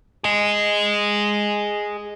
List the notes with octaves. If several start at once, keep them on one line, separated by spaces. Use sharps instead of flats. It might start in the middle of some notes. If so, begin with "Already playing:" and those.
G#4 D#5